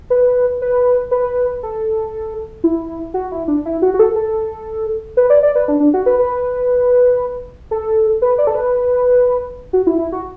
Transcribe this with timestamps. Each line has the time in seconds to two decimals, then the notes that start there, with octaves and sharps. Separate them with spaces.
0.10 B4
0.62 B4
1.11 B4
1.63 A4
2.64 E4
3.14 F#4
3.32 E4
3.48 D4
3.65 E4
3.82 F#4
3.94 F#4
3.99 A4
4.16 A4
5.17 B4
5.30 D5
5.43 D5
5.55 B4
5.68 D4
5.80 D4
5.94 F#4
6.06 B4
6.19 B4
7.71 A4
8.22 B4
8.38 D5
8.47 A4
8.55 B4
9.73 F#4
9.87 E4
9.99 E4
10.12 F#4